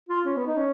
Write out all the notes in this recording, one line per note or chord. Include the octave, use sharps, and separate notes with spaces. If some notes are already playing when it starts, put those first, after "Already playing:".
F4
C#4
B3
D#4
C#4